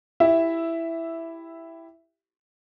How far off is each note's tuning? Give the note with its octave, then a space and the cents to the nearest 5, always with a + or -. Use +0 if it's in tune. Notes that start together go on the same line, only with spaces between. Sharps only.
E4 +5 G4 +0 E5 +0